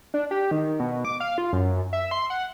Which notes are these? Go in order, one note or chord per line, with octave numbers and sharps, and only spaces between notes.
D4
G4
D#3
B2
D6
F5
F4
F#2
E5
C6
F#5